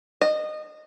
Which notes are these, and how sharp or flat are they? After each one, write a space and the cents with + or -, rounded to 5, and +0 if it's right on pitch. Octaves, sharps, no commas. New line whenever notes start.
D#5 -25